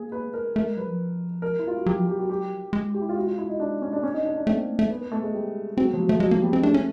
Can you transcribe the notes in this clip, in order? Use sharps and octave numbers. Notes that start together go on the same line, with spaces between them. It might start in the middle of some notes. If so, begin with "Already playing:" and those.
Already playing: A#3 G#4
B4
A#4
A3 A#4
G#3
F#3 B4
F3
A#4
E4
F4
F#4
F#3 G4
F3
F#3 G4
F#4
G4
G#3
G4
E4
F4
F#4
F4
E4
D#4
D4
C#4
D4
C#4
D#4
D4
D4
A3 C4
A#3
A3
A3
B3
B3
A3
G#3
G3
F#3 C4
B3
F3
F#3 A#3
F3 A3
F#3 G#3
F3 A#3
G3 B3
G#3 C4
A3 D4
C#4